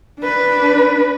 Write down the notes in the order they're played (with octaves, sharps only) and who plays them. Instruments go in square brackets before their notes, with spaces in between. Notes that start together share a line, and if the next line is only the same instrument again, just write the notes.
[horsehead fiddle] D4 B4